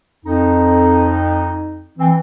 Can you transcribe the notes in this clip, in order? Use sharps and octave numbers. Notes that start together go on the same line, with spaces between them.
F2 D#4
E3 C4